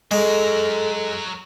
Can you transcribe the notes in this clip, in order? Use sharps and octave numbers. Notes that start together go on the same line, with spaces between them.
F#3 G#3 A4 A#4